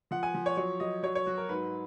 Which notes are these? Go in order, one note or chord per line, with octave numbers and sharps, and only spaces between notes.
F3 F#5
G#5
F3
C#5
F#3 C#5
F#3 D#5
F#3 C#5
C#5
F#3 F#4
A#4
G#2 B4